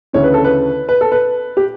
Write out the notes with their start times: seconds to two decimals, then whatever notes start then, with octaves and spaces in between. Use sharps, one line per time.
0.13 D2 C#3 E3 C#5
0.24 B4
0.34 A4
0.44 B4
0.89 B4
1.01 A4
1.12 B4
1.57 G4